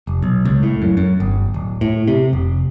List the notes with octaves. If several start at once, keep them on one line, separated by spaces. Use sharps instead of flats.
F1
B1
C#2
A2
F#2
F#2
G1
D1
A2
C3
F1